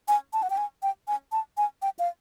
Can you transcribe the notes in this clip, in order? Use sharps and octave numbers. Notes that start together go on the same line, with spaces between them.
G#5
A5
F#5
G5
G#5
G5
G#5
A5
G#5
G5
F5